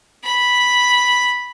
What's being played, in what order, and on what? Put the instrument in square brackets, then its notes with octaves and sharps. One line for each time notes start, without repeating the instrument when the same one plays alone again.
[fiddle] B5